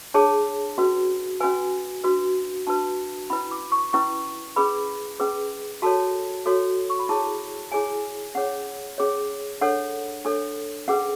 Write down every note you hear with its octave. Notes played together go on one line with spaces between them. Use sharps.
D4 G#4 C#5 A5
C#4 F#4 B4
C#4 F#4 B4 G#5
D4 F#4 B4
D4 F#4 B4 A5
C#4 E4 B4 B5
D6
C#6
C#4 E4 B4 C#6
C#4 G#4 B4 B5
C#4 G#4 B4
F#4 A4 C#5 A5
F#4 A4 C#5
C#6
B5
E4 G#4 C#5 A5
E4 G#4 C#5 G#5
C#4 G#4 C#5 F#5
C#4 G#4 C#5
D4 A4 C#5 F#5
D4 A4 C#5
C#4 G#4 B4 F#5